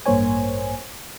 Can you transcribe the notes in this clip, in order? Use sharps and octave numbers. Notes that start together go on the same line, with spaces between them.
A1 G2 A#3 C5 C#5 G#5